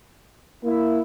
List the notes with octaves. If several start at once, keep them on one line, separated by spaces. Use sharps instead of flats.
A#3 E4